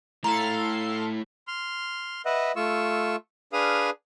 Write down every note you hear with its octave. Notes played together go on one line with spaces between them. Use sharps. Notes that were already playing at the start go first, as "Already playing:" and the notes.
A3 E4 A4 F5 A#5 C6
C6 F6
B4 D#5 E5 F#5
A3 F4 C#6 E6
D4 G#4 B4 F5 D#6 F6